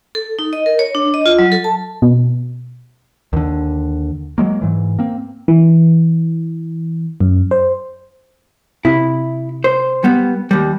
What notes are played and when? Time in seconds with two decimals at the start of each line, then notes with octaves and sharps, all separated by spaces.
0.15 A4
0.39 D#4
0.53 D#5
0.66 A#4
0.79 C#5
0.95 D4
1.14 D#5
1.26 F4
1.39 F#3
1.52 A4
1.64 A5
2.02 B2
3.33 D#2 D3
4.38 F#3 G#3 A#3
4.62 G#2 E3
4.99 A#3 C4
5.48 E3
7.20 F#2
7.51 C5
8.85 C3 E4
9.64 C5
10.04 G3 B3
10.51 D#2 G3